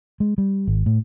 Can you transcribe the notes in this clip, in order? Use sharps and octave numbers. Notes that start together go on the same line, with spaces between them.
G#3
G3
G#1
A2